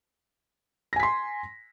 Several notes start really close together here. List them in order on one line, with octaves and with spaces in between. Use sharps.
A#6 G#5 B6 C6